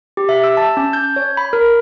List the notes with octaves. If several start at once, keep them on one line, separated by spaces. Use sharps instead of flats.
G4
E5
E6
A5
C#4
G6
C#5
B5
A#4